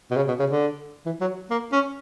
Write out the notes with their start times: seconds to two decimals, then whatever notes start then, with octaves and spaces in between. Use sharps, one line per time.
0.11 B2
0.16 C#3
0.28 B2
0.39 C#3
0.50 D3
1.06 E3
1.21 F#3
1.50 A#3
1.73 C#4